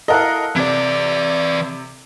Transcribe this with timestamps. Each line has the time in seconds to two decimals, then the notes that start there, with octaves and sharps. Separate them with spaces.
0.08 E4 A4 A#4 D#5 F5 F#5
0.56 C3 E3 D5